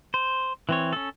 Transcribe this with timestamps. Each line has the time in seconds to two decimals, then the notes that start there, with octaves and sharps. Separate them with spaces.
0.14 C5
0.69 E3 C4 C#5
0.93 C#4 A4